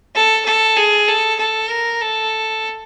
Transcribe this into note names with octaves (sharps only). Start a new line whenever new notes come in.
A4
A4
G#4
A4
A4
A#4
A4